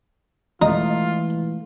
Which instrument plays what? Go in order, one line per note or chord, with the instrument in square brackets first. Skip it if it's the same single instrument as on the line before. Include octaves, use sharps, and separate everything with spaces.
[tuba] E3 [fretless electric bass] G#3 A3 [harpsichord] D#4 [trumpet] F4